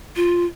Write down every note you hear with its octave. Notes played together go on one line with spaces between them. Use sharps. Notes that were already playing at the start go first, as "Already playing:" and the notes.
F4